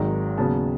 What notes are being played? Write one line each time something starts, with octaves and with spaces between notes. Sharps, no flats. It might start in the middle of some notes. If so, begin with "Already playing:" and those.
Already playing: G#1 G#2 D#3 F#3 A#5
D#2 C#3 F#3 B3 A5